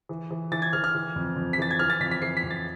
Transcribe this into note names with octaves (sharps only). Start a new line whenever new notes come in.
E3
E3
E3 A6
G#6
E3 F6
F6
E3
F2
F2
B6
E3 A6
G#6
E3 F6
A6
F2 B6
B6
E3 C7
B6
F2
A6